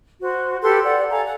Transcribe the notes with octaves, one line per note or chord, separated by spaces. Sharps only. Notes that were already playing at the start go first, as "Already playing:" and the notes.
F#4 C5
G4 A4 B4 C6
D5 F#5
A4 F5 G#5 A#5
F#5